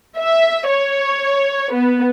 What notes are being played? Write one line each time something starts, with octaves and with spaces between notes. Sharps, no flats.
E5
C#5
B3